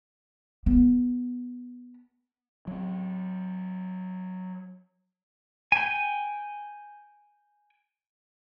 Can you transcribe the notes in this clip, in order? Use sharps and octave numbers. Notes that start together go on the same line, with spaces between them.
B3
F#3 C4
G5 G#5